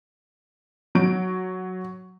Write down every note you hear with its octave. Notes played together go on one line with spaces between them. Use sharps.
F#3 D7